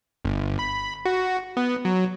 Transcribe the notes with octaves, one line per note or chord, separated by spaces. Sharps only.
G1
B5
F#4
B3
F#3